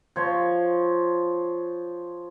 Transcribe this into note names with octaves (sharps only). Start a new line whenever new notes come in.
F3 C#5